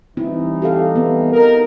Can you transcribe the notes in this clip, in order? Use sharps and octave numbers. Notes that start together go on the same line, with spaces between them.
E3 G3 C4 D#4 E4
G4 A4 F5
B3
D#4 A#4